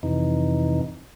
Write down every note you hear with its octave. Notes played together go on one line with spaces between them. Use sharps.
F2 C3 E3 D#4